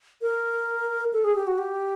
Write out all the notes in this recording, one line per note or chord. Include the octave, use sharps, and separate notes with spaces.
A#4
A4
G#4
G4
F#4
G4